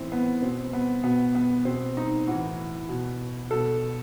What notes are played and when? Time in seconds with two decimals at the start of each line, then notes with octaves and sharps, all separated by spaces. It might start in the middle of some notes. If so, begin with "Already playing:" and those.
Already playing: A2 E3 C4
0.12 B3
0.42 B2 C4
0.73 B3
1.03 B2 B3
1.35 B3
1.65 B2 C4
1.97 D#4
2.27 A2 E3 F#4
2.89 B2
3.51 B2 A4